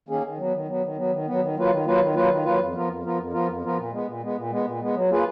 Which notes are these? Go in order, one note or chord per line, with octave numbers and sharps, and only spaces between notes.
D#3 A#3 C#4 G#4
D#3
F#3 B3
D#3
F#3 B3
D#3
F#3 B3
D#3
F#3 B3
D#3
F#3 A#3 F4 B4
D#3
F#3 A#3 F4 B4
D#3
F#3 A#3 F4 B4
D#3
F#3 A#3 F4 B4
F2
F3 B3 F4 A#4
F2
F3 B3 F4 A#4
F2
F3 B3 F4 A#4
F2
F3 B3 F4 A#4
A#2
G#3 B3
A#2
G#3 B3
A#2
G#3 B3
A#2
G#3 B3
F#3
A#3 F4 G#4 B4